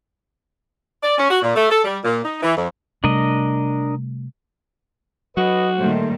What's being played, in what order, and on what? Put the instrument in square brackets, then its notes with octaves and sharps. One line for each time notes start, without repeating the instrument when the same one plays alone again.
[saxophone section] D5
C#4
F#4
A#2
A3
A4
G3
A#2
D#4
E3
F2
[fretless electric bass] C3 G3 A3 [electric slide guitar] D4 A#4 D#5
[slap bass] F#3 [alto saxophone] F#4 [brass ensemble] B4 D#5
[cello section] A#2 D#3 G3 [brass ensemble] A3 C5